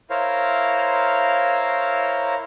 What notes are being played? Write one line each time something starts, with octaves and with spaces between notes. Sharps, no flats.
E4 A#4 C5 C#5 F5